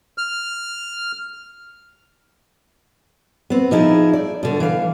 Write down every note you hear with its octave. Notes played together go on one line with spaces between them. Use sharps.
F6
B3 C4
F3 D#4 E4 G#4
D5
B2 D3
E3 F5